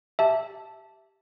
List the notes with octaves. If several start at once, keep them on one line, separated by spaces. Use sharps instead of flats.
G4 E5 A5